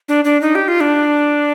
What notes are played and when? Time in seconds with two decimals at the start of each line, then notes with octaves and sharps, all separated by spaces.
0.08 D4
0.25 D4
0.42 D#4
0.55 G4
0.68 F4
0.81 D4